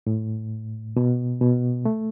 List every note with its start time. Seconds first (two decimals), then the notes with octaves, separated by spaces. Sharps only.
0.07 A2
0.97 B2
1.41 B2
1.85 A3